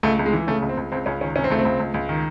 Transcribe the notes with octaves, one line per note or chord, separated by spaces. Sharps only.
C#2 A3
C#2
G#3
E3
C#3 A3
C#2
C4
C#2
C#2 C4
C#2 C#4
D#3 C#4
C3 C#4
C4
C#2 A3
C4
C#2
C#2
C#2
D#3